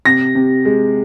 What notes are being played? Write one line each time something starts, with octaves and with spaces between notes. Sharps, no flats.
C3 A#6
C3
G#3